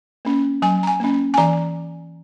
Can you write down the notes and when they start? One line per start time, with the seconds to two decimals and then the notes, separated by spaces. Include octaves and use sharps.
0.25 A#3 C#4
0.62 F#3 G#5
0.83 A#5
0.87 G#5
1.00 A#3 C#4
1.34 G#5
1.38 E3 A#5